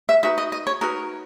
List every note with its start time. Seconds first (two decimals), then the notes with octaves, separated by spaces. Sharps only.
0.09 E5
0.23 D#4 F#4 B4 E5
0.38 D#5
0.52 D#5
0.67 C#5
0.81 D#4 F#4 A#4 B4